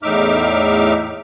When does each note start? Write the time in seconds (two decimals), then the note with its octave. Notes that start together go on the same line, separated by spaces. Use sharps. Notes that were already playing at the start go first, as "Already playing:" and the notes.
0.03 E2 A2 D#4 E5 D6 F6